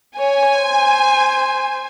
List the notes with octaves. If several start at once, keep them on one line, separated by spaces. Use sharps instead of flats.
C#5 G#5
C5